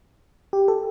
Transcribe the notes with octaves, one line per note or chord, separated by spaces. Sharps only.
G4
A4